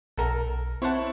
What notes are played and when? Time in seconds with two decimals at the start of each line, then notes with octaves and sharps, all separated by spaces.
0.17 B1 A4 A#4
0.82 C4 E4 C5 C#5 F#5 A5